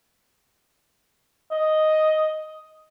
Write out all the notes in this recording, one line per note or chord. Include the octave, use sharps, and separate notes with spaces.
D#5